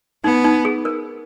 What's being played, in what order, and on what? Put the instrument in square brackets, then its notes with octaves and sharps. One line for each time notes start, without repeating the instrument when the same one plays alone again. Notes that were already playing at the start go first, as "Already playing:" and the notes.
[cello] B3 [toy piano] D#4
[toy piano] D#4
G#4
A#4